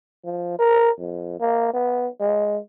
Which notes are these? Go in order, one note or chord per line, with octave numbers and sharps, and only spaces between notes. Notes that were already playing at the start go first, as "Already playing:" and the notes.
F3
A#4
F2
A#3
B3
G#3